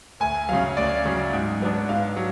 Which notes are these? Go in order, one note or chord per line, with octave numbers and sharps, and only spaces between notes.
D2 G#5
C#3 F#3 F5
D2 D5
C#3 F#3
G#2
F#3 B3 D4
G#2 F5
F#3